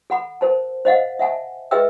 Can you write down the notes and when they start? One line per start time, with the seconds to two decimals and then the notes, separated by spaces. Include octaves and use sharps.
0.10 A4 F#5 B5
0.41 A#4 C5 A5
0.85 C5 D#5 F5 F#5
1.19 E5 F#5 G#5 A5
1.71 G#4 B4 D#5 E5 G5 E6